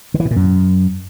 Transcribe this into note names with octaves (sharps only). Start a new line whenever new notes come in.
D3
E3
B2
A#2
F#2